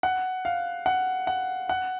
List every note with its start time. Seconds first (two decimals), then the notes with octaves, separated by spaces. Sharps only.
0.03 F#5
0.45 F5
0.86 F#5
1.27 F#5
1.69 F#5